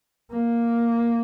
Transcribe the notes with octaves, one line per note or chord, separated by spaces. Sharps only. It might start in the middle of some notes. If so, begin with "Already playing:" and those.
A#3